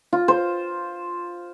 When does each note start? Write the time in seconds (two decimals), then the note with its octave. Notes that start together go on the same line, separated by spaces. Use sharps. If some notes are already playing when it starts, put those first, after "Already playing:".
0.13 F4
0.28 C5